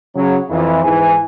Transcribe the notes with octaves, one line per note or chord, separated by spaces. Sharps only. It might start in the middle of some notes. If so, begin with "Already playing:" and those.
C#3 F#3
F2 E3
G#2 E3 G#5